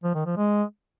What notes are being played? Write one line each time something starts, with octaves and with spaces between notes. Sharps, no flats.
F3
D#3
F3
G#3